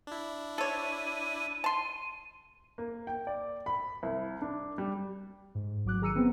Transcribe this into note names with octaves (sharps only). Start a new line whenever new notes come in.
D4 E4
A4 C#5 D#7
A5 C6
A#3
G5
D5
B5
C2
D4
G3
G#2
A1 F#3 D6 F#6
D#3 G#4 A#5 E6 C#7 D#7
E3 B3 C4